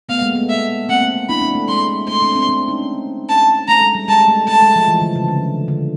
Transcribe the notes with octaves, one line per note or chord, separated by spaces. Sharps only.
A3 B3 F5
G#3 A#3
A3 B3
E5
A#3 C4 F#5
D4 E4 B5
C4 D4
A3
G#3 C6
A3
A3 C6
C4 D4
C4 D4
C4 D4
C#4 D#4
A5
A3 A#5
G#3
G3
G#3 A5
A3
A3 A5
G#3
F3
E3
D3
C#3
D3
D3